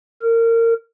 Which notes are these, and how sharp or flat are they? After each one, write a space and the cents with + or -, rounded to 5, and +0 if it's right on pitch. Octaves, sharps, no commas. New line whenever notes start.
A#4 -25